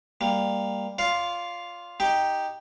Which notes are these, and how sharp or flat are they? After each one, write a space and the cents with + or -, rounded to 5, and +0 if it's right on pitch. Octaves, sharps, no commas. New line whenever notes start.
G3 +15 A#3 +0
F4 +0 D5 -40 F5 +0
D#4 +0 G4 +0 G5 +0